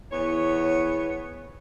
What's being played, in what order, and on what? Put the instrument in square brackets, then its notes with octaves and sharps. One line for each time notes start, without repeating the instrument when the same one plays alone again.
[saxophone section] E2 B3 C#5